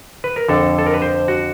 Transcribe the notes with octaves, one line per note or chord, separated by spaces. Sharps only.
B4
A#4
F2 D3 A4
A4
A#4
B4
C5
F#4